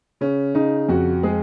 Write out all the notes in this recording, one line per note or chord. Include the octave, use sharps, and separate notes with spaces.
C#3 C#4
C#3 D#4
F2 F#4
G#3 G#4